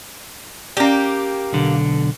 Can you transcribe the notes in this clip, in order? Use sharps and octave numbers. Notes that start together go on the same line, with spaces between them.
A#3 C#4 G4 D5
B1 D3